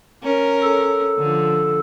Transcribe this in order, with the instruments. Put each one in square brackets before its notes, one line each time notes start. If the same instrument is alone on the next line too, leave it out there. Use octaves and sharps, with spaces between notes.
[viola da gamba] C#4 A#4
[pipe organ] A4
[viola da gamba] D3 F3